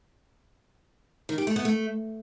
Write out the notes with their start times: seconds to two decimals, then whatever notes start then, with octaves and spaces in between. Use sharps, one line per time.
1.29 D#3
1.38 G4
1.47 A3
1.56 B3
1.65 A3